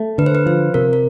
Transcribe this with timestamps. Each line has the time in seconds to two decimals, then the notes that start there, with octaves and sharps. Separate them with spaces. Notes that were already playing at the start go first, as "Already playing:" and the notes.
Already playing: A3
0.18 D3 B4
0.26 C5
0.35 B4
0.46 F3 C5
0.74 C3 A#4
0.93 A#4